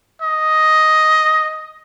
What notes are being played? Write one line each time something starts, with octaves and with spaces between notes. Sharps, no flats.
D#5